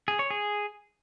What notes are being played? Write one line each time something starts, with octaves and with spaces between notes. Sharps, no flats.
G#4
C#5
G#4